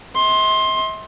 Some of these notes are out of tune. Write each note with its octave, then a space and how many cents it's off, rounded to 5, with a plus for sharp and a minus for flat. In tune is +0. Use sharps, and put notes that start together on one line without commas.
E5 -45 C6 +15